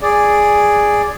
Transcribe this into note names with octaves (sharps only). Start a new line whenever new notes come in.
G#4 D5